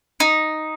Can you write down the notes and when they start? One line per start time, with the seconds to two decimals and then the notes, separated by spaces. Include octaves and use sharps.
0.20 D#4